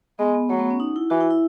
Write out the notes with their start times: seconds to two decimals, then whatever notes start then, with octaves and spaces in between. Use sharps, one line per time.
0.19 G#3 B3
0.34 B3
0.50 F#3 A3
0.59 B3
0.70 C#4
0.80 D#4
0.96 E4
1.10 E3 F#4
1.21 E4
1.31 E4